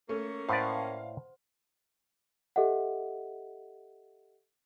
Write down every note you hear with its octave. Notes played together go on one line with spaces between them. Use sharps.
A3 A#3 C#4
A2 B4 C5 D5 F5 F#5 C6
G4 A4 D#5 E5 F#5